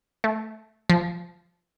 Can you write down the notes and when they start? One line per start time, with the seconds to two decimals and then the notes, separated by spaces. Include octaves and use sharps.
0.24 A3
0.90 F3